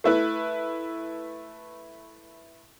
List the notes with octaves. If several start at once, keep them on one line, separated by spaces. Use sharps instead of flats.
A3 E4 B4